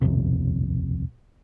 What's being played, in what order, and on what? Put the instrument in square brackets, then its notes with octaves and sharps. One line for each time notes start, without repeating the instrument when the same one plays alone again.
[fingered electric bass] D#1 B1 F2 C3